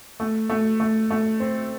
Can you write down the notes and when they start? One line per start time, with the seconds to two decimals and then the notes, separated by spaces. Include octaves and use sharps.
0.20 A3
0.49 A3
0.80 A3
1.10 A3
1.40 C4